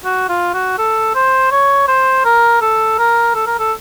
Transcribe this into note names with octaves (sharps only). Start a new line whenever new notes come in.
F#4
F4
F#4
A4
C5
C#5
C5
A#4
A4
A#4
A4
A#4
A4